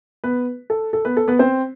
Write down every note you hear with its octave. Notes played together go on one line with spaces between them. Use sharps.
B3 B4
A4
A4
B3 B4
A4
B3 B4
C4 C5